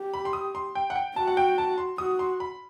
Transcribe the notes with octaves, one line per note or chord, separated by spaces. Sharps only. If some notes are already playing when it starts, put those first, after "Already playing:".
Already playing: G4
B5
C6
D#6
C6
G5
F#5
G5
F#4 A5
F#5
G5
A5
C6
F#4 D#6
C6
B5